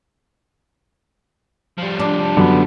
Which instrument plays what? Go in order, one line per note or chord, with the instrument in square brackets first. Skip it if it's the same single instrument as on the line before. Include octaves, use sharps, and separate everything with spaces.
[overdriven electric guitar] F3 G3
[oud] D4
[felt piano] F#2 [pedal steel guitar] D3 B3